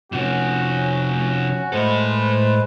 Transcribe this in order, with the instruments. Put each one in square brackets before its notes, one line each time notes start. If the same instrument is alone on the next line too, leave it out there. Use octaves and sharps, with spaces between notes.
[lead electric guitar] C3 F3 [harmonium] C#4 [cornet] F#4
[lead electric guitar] A2 A4 [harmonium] G#3 B4 C5